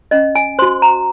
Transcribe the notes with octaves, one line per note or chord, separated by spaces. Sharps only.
C#4 D#5
G#5
F#4 C5 C6
A#5